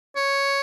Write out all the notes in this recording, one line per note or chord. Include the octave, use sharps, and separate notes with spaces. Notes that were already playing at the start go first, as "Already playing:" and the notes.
C#5